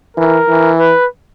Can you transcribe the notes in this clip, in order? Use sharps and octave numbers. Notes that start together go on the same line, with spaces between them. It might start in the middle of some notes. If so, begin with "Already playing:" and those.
E3 A#4
E3
B4